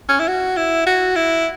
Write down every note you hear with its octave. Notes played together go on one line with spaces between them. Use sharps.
C#4
E4
F#4
E4
F#4
E4